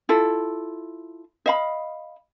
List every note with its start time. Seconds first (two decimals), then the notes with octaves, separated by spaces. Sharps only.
0.09 E4 F4 A4
1.46 D#5 F5 B5